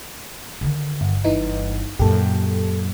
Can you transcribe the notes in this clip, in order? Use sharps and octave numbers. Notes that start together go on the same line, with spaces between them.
D3 D#3
G1
G1 E3 D#4
F#2 A#2 G4 A4